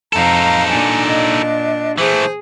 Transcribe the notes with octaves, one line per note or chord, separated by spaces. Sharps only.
F2 D#4 A4 F5 A#5
A#2 D4 G#5
D#5
E3 A3 G#4 C5